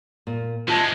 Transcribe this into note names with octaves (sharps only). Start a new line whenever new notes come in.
A#2
C3 G#3 F4 A5